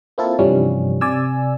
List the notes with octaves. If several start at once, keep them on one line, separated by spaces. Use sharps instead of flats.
A#3 C4 E4 F4 A4
G2 C3 E3 F3 G3 C#4
C3 D5 G#5 E6